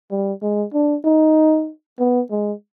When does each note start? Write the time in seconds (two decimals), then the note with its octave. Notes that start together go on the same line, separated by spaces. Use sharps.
0.11 G3
0.42 G#3
0.73 D4
1.04 D#4
1.99 B3
2.31 G#3